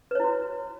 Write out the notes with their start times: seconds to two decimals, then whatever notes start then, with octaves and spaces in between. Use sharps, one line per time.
0.11 B4
0.15 C#5
0.20 E4
0.24 F#4